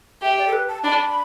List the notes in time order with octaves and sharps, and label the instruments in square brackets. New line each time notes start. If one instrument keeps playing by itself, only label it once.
[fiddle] G4 [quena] E5
[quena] D5
A4
B4
A5
[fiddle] D4 [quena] B5